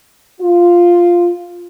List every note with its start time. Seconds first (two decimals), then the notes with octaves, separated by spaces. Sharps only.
0.40 F4